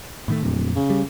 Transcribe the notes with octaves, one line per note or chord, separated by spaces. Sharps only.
A2 D#3 A3
D1 F2 A#2
C#3
G3